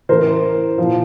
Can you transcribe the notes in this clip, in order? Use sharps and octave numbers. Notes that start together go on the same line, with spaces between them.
A2 E3 A#4 C5
A#2 F3